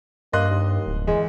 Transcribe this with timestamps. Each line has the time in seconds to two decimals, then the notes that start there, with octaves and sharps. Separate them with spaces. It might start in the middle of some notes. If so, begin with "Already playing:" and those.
0.33 G2 A#3 D#5 C6 F#6
0.50 D#2
0.86 D1
1.07 E2 G#3